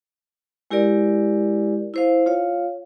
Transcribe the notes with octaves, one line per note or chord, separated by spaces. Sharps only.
G#3 E4 G4 A#4 D5
E4 C5 F5
F4 C#5 F5